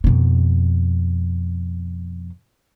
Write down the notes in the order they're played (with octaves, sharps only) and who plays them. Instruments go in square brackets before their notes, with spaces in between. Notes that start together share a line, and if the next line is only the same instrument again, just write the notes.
[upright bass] F2 B2